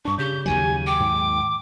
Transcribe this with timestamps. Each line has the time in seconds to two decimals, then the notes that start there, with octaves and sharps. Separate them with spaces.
0.05 G2 D4 C#6
0.18 C#3 G4 G6
0.46 D#2 D#3 F#3 G#5
0.86 G5 D6
1.00 G#2